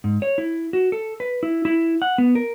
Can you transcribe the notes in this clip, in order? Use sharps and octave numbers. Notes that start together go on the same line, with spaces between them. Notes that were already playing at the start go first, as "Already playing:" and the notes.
G#2
C#5
E4
F#4
A4
B4
E4
E4
F#5
B3
A#4